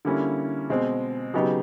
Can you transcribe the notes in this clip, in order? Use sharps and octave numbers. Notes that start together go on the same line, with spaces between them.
D3 G3 A#3 C#4 E4
B2 G#3 C4
C#3 F#3 B3 D#4 G4